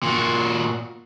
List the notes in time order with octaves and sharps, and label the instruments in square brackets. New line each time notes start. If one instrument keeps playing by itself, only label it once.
[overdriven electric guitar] A#2 F#4